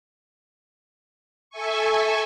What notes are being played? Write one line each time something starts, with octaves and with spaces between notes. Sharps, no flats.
A4 E5 G#5 C#6